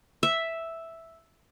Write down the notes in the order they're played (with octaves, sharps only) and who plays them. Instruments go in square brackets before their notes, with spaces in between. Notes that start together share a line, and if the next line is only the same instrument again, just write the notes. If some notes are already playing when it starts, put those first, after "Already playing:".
[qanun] E5